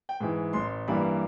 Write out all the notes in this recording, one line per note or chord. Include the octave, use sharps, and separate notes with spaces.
G5
G#2 E3
A1 C6
G2 E3 G3 A#3 B5